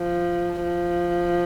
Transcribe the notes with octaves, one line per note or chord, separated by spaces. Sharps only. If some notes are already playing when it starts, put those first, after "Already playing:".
Already playing: F3
F3